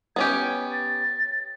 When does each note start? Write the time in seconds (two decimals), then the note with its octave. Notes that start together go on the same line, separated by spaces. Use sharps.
0.16 B3 C#4 G4 G#6
0.72 A6